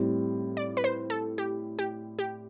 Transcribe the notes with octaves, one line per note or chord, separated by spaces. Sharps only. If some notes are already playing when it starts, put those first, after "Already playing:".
Already playing: A2 G3 C4
D5
B4
C5
A4
G4
G4
G4